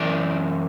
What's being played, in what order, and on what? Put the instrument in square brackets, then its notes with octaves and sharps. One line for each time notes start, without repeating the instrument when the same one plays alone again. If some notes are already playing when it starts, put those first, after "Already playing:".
Already playing: [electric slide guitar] F#2 E3 D5